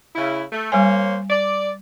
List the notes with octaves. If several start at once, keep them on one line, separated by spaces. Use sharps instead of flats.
C#3 E4
A3
G3 A#3 C5 C#5 G#5
D5